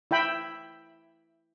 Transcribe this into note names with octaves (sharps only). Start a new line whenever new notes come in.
E4 E5 G5 B5